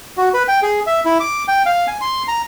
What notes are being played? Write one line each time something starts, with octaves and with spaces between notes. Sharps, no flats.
F#4
B4
G5
G#4
E5
E4
D6
G5
F5
G#5
C6
A#5